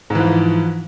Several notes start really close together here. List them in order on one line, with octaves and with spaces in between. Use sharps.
G#2 E3 F3